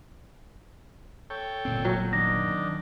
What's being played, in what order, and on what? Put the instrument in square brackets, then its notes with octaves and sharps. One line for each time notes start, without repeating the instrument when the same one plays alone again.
[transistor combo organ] A4 C#5 G5
[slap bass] G1 A#2 C4
[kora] F#3
[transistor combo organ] D#3 D4 [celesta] A#6